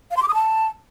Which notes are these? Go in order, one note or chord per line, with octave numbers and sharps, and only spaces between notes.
F5
C6
D6
D#6
A5